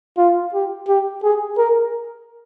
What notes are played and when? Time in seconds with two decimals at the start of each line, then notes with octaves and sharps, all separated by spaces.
0.17 F4
0.53 G4
0.88 G4
1.23 G#4
1.58 A#4